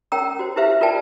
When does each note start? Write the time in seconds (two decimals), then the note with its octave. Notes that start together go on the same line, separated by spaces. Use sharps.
0.12 C#4 A#4 C#5 G5 A#5 E6
0.39 F#4 C5
0.56 E4 G4 B4 C5 E5 F5
0.81 F4 A#4 B4 D5 G5 A5